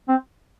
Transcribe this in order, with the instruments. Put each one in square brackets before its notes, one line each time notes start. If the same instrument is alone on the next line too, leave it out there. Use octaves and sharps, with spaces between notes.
[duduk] C4